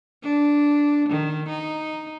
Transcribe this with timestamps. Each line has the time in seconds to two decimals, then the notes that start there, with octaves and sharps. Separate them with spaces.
0.23 D4
1.09 D#3
1.49 D#4